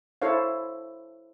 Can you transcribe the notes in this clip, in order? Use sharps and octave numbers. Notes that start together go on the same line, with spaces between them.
E4 A4 C5 C#5 F5